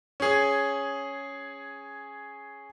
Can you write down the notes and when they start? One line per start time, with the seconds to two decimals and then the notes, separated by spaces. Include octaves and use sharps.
0.20 C#4 G#4